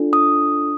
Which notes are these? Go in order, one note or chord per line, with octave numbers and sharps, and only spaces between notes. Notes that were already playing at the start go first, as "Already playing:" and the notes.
Already playing: D4 F4 A4
D#6